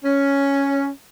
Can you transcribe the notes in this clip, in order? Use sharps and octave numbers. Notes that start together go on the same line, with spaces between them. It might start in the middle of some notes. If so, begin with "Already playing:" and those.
C#4